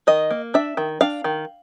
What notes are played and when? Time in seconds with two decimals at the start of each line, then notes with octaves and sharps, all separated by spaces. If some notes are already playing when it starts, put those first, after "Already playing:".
0.07 D#3 D#5
0.31 A#3
0.54 D4 E5
0.77 D#3
1.01 D4 F5
1.24 D#3